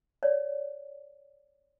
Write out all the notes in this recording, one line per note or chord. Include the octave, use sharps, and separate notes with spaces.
C#5 D5